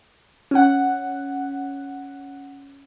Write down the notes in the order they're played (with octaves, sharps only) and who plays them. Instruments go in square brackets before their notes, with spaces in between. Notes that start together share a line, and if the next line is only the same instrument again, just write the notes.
[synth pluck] C#4 F#5